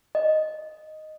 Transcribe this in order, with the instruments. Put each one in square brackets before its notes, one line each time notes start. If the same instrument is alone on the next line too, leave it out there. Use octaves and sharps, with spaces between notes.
[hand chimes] D#5